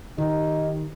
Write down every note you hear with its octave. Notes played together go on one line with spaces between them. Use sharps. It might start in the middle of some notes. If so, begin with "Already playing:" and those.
D#3 D#4 G4